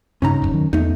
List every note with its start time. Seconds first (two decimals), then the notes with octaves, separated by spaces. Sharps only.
0.22 G2 C#3 C#4 D#4 A#5
0.42 E1 C#2 F#2
0.53 D#3 F#3
0.73 E2 A3 D#4